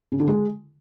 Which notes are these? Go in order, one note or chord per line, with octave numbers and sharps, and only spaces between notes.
C#3
D3
G#3